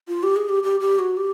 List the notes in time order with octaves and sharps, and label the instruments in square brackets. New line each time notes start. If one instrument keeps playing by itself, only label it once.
[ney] F4
G4
G#4
G4
G4
G4
F#4
G4